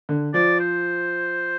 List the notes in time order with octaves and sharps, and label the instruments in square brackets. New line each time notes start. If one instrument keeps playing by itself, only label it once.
[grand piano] D3
[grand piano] F3 [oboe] D5
[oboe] C5